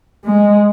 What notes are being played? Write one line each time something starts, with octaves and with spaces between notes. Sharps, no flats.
G#3